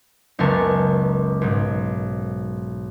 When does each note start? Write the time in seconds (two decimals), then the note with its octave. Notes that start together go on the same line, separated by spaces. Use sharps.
0.39 F#1 C#2 B3 A#4 A5 C#6
1.42 B1 G#2